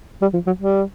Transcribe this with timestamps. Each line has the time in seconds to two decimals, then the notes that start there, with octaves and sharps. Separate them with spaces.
0.22 G3
0.34 F3
0.47 F#3
0.60 G3